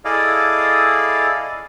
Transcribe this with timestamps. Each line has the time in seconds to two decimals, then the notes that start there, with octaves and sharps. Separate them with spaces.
0.05 E4 G#4 A4 D5 D#5 F5